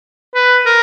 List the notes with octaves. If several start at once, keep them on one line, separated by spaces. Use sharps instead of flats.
B4
A#4